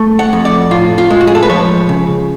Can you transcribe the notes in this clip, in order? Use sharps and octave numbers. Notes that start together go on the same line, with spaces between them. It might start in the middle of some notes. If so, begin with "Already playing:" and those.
Already playing: A3
F#5
F2
D5
A2 F4
F4
G#3
F#4
G#4
A4
B4
F3 C#5
C#3